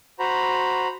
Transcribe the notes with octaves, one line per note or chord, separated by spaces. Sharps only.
F#4 C5 A#5 B5